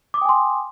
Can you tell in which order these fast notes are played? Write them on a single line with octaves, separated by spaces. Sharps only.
D6 D#6 G5 G#5 C6